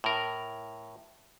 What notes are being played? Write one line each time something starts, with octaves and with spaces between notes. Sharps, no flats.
A2 A#4